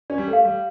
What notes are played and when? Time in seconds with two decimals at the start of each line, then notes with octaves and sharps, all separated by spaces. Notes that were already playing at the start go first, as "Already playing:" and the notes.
0.10 C#4 D5
0.18 G3
0.28 A3
0.33 F5
0.45 G3